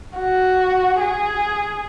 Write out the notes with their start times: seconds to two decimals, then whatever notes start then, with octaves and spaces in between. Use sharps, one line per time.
0.18 F#4
1.00 G#4